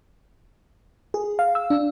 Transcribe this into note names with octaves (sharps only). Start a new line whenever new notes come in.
G#4
F5
E6
D4